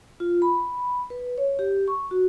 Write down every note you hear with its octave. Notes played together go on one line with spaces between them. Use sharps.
F4
B5
B4
C#5
G4
C#6
F#4